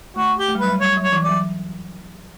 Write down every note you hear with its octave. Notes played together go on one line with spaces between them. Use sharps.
A3 F#4
G4
A3
G3
F#3 B4
G3
G3 C#5
F#3
C#5
E3
D5
F#3